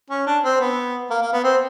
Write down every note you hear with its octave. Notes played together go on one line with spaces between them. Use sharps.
C#4
D4
C4
B3
A#3
A#3
B3
C4